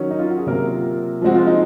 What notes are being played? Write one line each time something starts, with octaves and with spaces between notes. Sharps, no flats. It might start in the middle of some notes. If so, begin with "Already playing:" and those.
Already playing: D#3 F#3 C#4
D#4
F4
F#4
G#4
C3 F#3 A#3 A#4
F4
F3 G#3 C4 F#4
F4
D#4